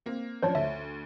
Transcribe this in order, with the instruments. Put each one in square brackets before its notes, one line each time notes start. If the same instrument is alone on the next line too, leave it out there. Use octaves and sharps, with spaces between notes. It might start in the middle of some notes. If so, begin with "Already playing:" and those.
[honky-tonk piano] A#3 C4
[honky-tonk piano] F#2 F3 D4 [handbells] C5 C#5 A5
[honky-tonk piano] D2 [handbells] E5